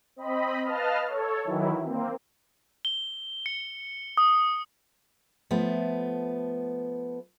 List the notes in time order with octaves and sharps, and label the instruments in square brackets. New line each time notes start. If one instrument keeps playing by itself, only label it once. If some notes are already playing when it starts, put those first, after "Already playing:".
[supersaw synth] C4 D#5 B5
B4 D#5 F5 A5 F6
A4 C#5
D#3 E3 F#3 E4
A#3 C4
[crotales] G7
C#7
D#6
[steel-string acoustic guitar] F3 A3 B3